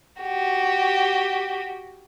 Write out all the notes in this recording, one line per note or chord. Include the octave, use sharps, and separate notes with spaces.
F#4 G4